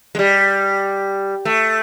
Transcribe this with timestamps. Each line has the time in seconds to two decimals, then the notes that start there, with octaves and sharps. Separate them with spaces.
0.15 G#3
0.19 G3
1.45 A3